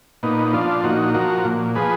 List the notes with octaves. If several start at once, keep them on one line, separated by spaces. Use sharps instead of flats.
A#2 B3 D#4
F3 D4 F4
A#2 D#4 F#4
F3 F#4 A#4
A#2
F3 G#4 B4